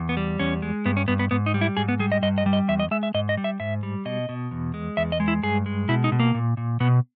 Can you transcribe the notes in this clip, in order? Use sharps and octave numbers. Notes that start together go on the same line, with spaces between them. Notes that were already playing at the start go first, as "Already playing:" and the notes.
Already playing: E2
B3
G3
E2 C#4
G#3
G2 B3
C#4
G2 B3
B3
G#2 B3
D#4
G3
E4
G#2 G#4
B3
G3 G#4
D#5
G2 D#5
D#5
G3
D#5
E2 E5
D#5
G#3 E5
E5
G#2 D#5
D#5
G3
E5
G#2 E5
G3
B2 D#5
B2
E2
G#3
E2 E5
D#5
G#3
E4
G2 G#4
G#3
B2 E4
D#4
B2
A#3
A#2
A#2
B2 B3